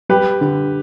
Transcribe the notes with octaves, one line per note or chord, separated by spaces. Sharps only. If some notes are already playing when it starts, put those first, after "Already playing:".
G3 G4 B4
D3